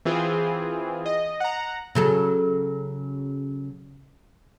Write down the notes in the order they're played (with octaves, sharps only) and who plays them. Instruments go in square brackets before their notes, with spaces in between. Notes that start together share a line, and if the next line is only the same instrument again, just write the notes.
[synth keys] E3 C4 F4 G#4
D#5
F#5 A#5
[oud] C#3 F#3 A4